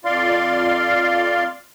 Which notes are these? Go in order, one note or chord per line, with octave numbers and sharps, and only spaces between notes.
F2 F4 D5 F5 C6